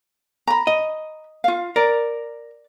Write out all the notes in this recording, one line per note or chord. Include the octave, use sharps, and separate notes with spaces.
A#5 B5
D#5
F4 F5
A#4 D5